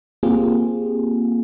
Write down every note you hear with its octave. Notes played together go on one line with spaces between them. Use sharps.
A#3 C4 F4 G4 G#4